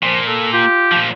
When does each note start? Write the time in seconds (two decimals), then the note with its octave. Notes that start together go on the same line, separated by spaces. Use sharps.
0.03 A#2 F3
0.27 A4
0.53 F4 G4
0.92 A#2 F3